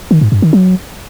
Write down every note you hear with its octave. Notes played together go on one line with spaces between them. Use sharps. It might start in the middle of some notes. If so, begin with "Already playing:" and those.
D#3
G#2
G2
D#3
F#3